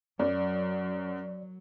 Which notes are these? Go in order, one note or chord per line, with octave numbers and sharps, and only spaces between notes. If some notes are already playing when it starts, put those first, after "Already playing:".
F#2 F#3 D5